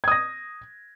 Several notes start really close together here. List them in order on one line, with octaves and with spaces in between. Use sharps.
G#6 D#6 A#6